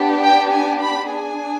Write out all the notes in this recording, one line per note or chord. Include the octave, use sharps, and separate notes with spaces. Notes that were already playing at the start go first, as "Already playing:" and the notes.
Already playing: B3 D4 G4
G5
G#5
B5
D4 G#4 G#5